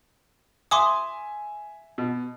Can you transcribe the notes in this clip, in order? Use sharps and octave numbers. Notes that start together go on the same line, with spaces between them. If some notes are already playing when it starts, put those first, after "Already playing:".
E5 G#5 C6 D6 D#6
B2